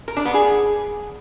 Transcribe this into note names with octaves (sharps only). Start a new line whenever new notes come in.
A#4
D4
B3
G#4